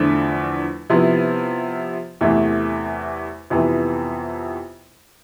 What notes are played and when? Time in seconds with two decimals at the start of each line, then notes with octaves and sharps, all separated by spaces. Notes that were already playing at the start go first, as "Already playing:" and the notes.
Already playing: E2 D3 F3 A3 D4
0.90 C3 F3 B3 E4
2.21 E2 C3 E3 A3
3.50 F2 C3 E3 B3